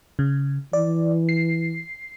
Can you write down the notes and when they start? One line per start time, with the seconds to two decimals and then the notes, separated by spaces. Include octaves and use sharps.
0.19 C#3
0.73 E3 D5
1.29 C7